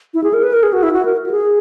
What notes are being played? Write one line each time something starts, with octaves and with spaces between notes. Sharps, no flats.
E4
G#4
A#4
B4
A#4
G#4
F#4
E4
F#4
A#4
F#4
G#4